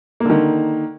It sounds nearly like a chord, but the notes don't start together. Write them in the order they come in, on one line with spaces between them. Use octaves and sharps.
A#3 D3 D#3